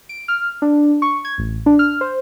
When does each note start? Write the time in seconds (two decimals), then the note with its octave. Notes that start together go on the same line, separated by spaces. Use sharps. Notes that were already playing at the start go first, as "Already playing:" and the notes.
0.09 D7
0.28 F6
0.62 D4
1.02 C#6
1.25 G#6
1.38 A1
1.66 D4
1.79 F6
2.01 C5